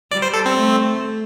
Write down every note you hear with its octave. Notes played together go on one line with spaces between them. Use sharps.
G3 D5
C5
A4
C4
A3